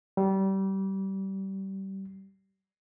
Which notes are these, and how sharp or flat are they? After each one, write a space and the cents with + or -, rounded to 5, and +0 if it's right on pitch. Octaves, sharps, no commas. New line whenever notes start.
G3 -25